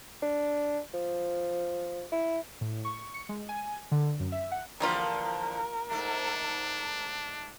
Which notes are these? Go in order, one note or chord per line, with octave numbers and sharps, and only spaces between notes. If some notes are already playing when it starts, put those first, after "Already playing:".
D4
F3
E4
A2
C#6
C#7
G#3
G#5
D3
F#2
E5
F#5
E2 D3 F3 G3 A#3 F4 A#4
G#2 A3 D4